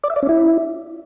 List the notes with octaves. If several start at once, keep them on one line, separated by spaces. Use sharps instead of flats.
D5
E5
D5
C#4
E4